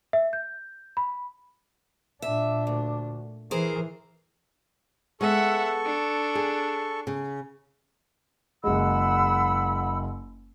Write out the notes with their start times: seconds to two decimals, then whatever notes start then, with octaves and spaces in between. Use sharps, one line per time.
0.13 E5
0.33 G6
0.97 B5
2.22 A#2 D4 E5
2.67 D2
3.51 E3 G#4 A#4 C5
5.21 G#3 B3 A4 E5 F#5 C#6
5.85 D4
6.35 G#4
7.07 C#3
8.64 F#1 G#3 F#5 B5 E6